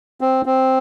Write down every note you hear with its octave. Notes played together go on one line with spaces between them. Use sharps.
C4
C4